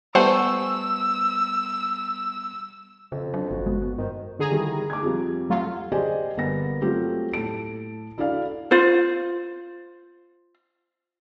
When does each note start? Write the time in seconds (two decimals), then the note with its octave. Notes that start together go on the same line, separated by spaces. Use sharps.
0.15 G3 A3 B3 C5 F#5 G#5 E6
3.12 F2 C#3
3.34 F#3 D4
3.51 G1 F#4
3.66 F#1 G#3 B3
3.82 B3
3.98 G2 D#3 C5
4.39 D3 G#4 A#5
4.51 D#3 G3 E4
4.90 D6 G#6
5.03 F2 F3 G3
5.50 F#3 A3 F4
5.92 G4 G#4 C5 D5 D#5 G#5
6.37 G1 A#3 B3 B4 A#6
6.82 F#3 A3 C4 F4 G4
7.33 A2 A4 A5 D7
8.18 D4 E4 F#4 A4 D5 F5
8.71 F4 C5